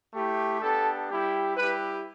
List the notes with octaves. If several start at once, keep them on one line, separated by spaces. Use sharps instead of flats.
A3 E4 G4
B3 D4 G4 A4
G3 E4 G4
G3 E4 G4 B4